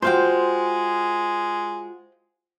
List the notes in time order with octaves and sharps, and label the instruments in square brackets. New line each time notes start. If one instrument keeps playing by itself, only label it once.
[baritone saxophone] G#3 [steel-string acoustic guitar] F4 F#4 [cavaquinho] C5 F5 G5